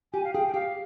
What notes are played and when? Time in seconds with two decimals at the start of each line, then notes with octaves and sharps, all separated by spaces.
0.14 G4 G#5
0.24 F5
0.34 G#4 G5
0.47 G5
0.54 G4 F5